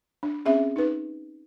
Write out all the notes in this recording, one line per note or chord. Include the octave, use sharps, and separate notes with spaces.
D4
C4 C#4 G#4 E5
D#4 B4